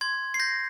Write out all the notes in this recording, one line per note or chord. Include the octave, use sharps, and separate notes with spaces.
C6 G#6
C7
G6 A#6